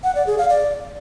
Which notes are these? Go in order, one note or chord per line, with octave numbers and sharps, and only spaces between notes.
F#5
D5
G#4
F5
D5